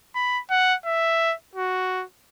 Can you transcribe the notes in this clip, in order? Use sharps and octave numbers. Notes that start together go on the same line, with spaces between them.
B5
F#5
E5
F#4